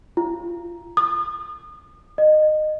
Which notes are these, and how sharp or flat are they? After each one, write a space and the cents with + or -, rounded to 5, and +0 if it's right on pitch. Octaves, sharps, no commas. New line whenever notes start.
F4 -25
D#6 -35
D#5 -20